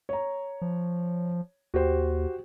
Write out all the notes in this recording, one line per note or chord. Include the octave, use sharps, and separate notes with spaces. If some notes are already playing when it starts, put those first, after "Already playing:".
C#5 A#5
F3
D#2 F#4 G4 C5